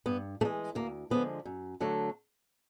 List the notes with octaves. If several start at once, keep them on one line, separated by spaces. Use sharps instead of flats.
G2 B3
E3 G#3 A3
D2 A#3
D3 F3 G#3 B3
F#2
D3 F#3 A3